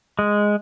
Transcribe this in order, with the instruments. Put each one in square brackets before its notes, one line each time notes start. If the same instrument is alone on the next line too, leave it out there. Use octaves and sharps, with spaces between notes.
[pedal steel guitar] G#3